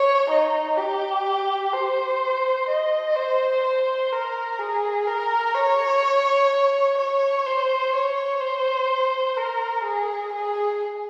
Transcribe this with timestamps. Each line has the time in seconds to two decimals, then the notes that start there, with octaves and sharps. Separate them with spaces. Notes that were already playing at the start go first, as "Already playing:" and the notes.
Already playing: C#5
0.30 D#4
0.78 G4
1.73 C5
2.69 D#5
3.16 C5
3.64 C5
4.12 A#4
4.59 G#4
5.08 A#4
5.55 C#5
6.98 C#5
7.46 C5
7.93 C#5
8.41 C5
9.37 A#4
9.84 G#4
10.33 G#4